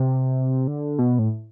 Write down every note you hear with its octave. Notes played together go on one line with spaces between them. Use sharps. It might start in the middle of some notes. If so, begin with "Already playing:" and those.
Already playing: C3
D3
B2
A2